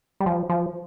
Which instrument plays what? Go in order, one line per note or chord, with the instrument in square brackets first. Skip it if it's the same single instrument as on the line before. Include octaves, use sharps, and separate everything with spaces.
[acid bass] G3
F3
F3